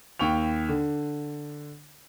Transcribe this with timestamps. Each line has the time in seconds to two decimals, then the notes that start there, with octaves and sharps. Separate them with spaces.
0.19 D#2 G5 C#6 F7
0.69 D3